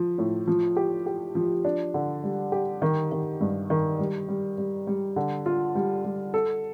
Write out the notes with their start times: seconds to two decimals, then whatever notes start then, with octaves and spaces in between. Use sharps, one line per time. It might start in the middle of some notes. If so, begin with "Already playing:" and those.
Already playing: F3
0.18 A2
0.48 F3
0.77 G4
1.06 G4
1.35 F3
1.65 D4
1.94 D3
2.24 G3
2.52 G4
2.82 D#3
3.12 D#3
3.41 G2
3.70 D#3
3.99 G3
4.28 G3
4.58 G3
4.87 G3
5.16 D3
5.46 F4
5.75 G3
6.05 G3
6.34 A4